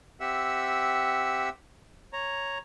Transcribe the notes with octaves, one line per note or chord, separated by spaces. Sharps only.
C4 G4 E5 F#5 E6
C#5 A#5